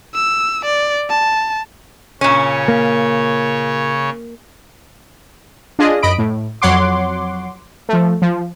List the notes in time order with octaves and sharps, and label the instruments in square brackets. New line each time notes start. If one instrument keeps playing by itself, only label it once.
[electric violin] E6
D5
A5
[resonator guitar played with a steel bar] A#2 C#4 [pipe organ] C#3 C#5
[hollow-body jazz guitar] A#3
[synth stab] D4 F4 G#4 D#5
F#2 D#5 B5 D7
A2
F2 F#3 C#5 F#5 C6 D6
F3 A3
F3